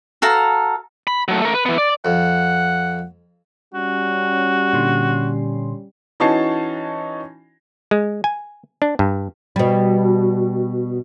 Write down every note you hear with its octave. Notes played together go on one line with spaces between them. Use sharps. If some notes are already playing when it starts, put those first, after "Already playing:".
F#4 A4 F5 A#5
B5
F#3 A3
A3 A#4
B4
E3 B3
D5
F2 F#5
G3 C#4 F#4
A#2 D3 C6
E3 C#4 D#4 F#4 A5 C7
G#3
G#5
D4
G2
B2 G3